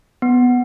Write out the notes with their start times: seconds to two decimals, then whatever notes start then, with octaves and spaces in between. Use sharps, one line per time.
0.22 B3